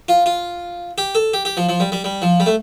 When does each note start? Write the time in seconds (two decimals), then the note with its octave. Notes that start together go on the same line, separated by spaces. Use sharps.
0.08 F4
0.26 F4
0.98 G4
1.15 A4
1.34 G4
1.45 G4
1.57 F3
1.69 F3
1.80 G3
1.92 G3
2.04 G3
2.22 F3
2.40 G3
2.46 A3